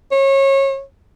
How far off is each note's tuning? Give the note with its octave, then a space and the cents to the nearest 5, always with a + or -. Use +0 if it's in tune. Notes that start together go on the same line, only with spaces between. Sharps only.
C#5 -25